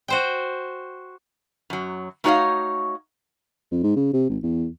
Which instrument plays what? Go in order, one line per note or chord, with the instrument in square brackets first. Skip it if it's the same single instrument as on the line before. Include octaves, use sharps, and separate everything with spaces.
[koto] F#4 C5 G5
[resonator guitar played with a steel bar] F#2 F#3
A3 D#4 F#4 C#5 D#5 F5
[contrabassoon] F2
G#2
C#3
C3
G#1
E2